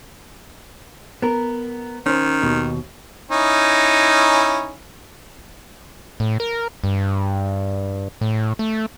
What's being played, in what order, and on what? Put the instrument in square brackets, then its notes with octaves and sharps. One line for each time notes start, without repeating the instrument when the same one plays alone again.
[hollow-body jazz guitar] B3 A#4
[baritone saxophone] D#3 [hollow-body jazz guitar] C#4 C5
[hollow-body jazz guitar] D#2 B2
[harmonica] C#4 D#4 E4
[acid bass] A2
A#4
G2
A2
A3